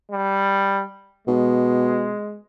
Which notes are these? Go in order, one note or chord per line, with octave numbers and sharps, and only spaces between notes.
G3
B2 G#3